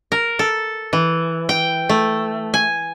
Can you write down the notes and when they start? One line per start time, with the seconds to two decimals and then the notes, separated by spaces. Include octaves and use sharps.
0.12 A#4
0.39 A4
0.93 E3
1.49 G5
1.89 A3
2.54 G#5